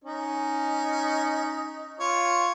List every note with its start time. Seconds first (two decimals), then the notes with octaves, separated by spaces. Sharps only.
0.04 C#4 D#4
2.00 F4 C#5